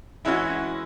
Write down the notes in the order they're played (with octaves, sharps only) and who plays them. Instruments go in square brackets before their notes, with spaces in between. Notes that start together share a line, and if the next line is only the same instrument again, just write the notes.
[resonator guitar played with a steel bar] E3 G#3 C#4 F#4 [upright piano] E4